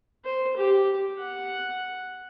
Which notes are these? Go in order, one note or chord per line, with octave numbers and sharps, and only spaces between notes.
C5
G4
F#5